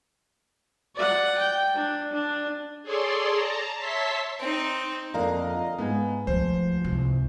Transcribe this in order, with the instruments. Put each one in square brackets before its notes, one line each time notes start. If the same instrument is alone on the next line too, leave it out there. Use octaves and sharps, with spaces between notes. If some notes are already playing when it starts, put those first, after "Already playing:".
[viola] D5 F#5
G5
D4
D4
[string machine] G#4 A4 C#5 D5 C6
A5 A#5
C#5 E5 A5 C6 B6
[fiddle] C4 D#4
[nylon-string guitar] F2 D3 A#3 [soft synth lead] D#5 [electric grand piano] F5 A#5
[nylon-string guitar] G#2 B4 G#5 [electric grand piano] B3
[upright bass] D2 [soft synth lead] F3 [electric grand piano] C5
[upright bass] C2